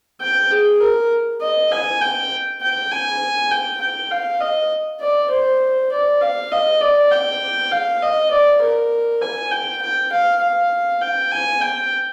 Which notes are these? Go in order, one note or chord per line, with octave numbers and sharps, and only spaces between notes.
G5
G#4
A#4
D#5
G#5
G5
G5
G#5
G5
G5
F5
D#5
D5
C5
D5
F5
D#5
D5
G5
F5
D#5
D5
A#4
G#5
G5
G5
F5
F5
G5
G#5
G5